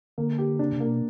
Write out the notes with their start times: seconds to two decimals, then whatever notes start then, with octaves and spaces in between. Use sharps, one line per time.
0.18 D3 A#3
0.38 G4
0.59 C#3 D4
0.73 C3
0.80 A#3
0.87 B2